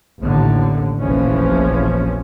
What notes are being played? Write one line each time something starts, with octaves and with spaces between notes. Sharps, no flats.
A1 D#2 A2 D3
F1 A#1 E3 F3 C#4